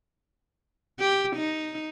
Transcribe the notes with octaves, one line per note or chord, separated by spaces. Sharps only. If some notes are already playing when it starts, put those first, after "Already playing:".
G4
D#4